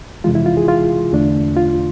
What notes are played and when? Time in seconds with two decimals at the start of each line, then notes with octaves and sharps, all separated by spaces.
0.24 F2 C3 E3 G#3 F4
0.35 E4
0.46 F4
0.57 G#4
0.68 F4
1.12 E2 D3 A3 D4
1.57 F4